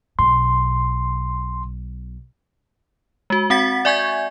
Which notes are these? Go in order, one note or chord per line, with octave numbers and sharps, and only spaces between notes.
B1 B2 C6
G#3 F#4
C4 F#4 F#5 A6 B6
D5 E5 G#5 C#6 G6 G#6